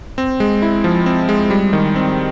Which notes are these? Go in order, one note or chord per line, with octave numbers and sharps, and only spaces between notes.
C4
G#3
E4
F3
C4
G#3
G3
D#3
C4